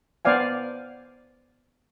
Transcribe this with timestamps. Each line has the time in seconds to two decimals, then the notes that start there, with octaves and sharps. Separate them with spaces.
0.25 B3 C5 D5 F5 G#5